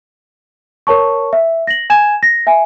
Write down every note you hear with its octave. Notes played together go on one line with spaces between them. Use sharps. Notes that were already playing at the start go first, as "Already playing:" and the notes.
A#4 C#5 A5 C#6
E5
A#6 F#7
G#5 G#6 E7
A#6
E5 G#5